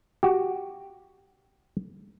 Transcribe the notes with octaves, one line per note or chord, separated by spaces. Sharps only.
F#4 G4